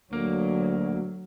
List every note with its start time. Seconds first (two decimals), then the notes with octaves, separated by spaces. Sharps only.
0.13 D2 F#3 A#3